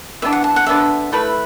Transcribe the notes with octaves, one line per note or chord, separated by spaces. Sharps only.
E3 B3 D4 E5
F#5
A5
F#5
D3 B3 D4 A4 E5
A3 E4 B4